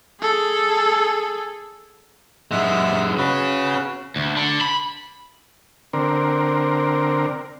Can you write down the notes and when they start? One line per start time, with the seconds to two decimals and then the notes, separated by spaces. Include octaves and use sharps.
0.20 G#4 A4
2.51 F#2 G#3 E5 F#5
3.17 C#4 F#4 G#4 B4
4.16 D2
4.37 D3
4.61 B5
5.93 D3 C4 A#4